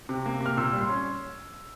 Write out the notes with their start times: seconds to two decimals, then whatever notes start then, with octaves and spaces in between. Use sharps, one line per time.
0.09 C3
0.26 A#3
0.41 C3
0.46 F6
0.57 A#2 E6
0.73 G3
0.81 C6
0.89 C#4